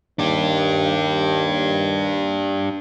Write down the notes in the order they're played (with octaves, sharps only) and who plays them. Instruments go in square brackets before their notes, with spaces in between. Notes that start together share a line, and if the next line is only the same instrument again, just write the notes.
[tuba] D#2 [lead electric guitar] D4 G4